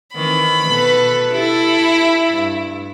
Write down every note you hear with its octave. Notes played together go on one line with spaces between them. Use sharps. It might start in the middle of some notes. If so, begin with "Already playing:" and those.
D#3 E3 C4 B5
B2 A4 B4
E4 G4 A4
G2